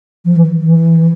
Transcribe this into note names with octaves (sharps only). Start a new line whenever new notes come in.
F3
E3
E3